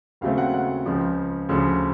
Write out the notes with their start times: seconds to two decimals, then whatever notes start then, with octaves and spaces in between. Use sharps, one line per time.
0.21 D#2 C#3 F#3 A3 C4 F5
0.38 F#5
0.54 F#5
0.86 C#2 C#3 F3
1.49 D2 C#3 F3